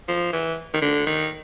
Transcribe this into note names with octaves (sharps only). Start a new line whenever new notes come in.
F3
E3
D#3
D3
D#3